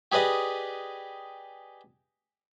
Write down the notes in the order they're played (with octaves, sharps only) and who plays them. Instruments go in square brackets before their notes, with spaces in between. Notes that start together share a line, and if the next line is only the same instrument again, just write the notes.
[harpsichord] G4 G#4 B4 D5 D#5